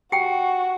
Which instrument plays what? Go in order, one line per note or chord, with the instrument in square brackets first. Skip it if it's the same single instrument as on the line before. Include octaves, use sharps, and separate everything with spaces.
[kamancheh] F#4 [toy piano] G4 G5